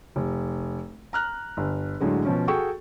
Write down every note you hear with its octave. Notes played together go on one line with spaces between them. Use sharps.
F1
A#5 F6 F#6
G1
A2 D3 F#3 G#3
B2 F3 C#4
F#4 G#4 A4 G5 C#6